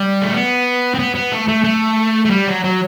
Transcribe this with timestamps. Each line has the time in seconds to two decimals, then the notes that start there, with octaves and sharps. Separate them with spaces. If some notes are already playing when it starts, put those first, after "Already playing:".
Already playing: G3
0.22 A3
0.33 B3
0.94 C4
0.99 B3
1.15 B3
1.32 A3
1.48 A3
1.64 A3
2.25 A3
2.30 G3
2.47 F#3
2.64 F#3